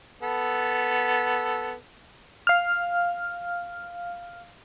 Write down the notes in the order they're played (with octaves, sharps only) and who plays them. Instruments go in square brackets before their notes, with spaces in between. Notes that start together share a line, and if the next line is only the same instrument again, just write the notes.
[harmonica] B3 A4
[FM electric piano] F5 F6